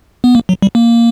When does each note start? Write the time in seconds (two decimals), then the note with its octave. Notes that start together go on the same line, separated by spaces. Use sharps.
0.24 B3
0.35 A#3
0.49 F#3
0.62 G3
0.75 A#3